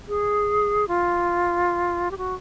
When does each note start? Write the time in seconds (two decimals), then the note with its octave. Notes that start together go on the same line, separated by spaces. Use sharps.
0.08 G#4
0.88 F4
2.11 G4
2.18 F#4